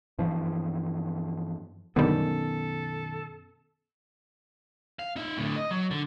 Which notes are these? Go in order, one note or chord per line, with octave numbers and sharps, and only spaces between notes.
G2 E3 F3
F#2 B2 D3 D#3 G3 B3 C#4 A4
F5
D#4 E5
A2 D3
D#5
F#3
D3